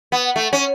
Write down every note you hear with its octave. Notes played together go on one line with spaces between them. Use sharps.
B3
A3
C#4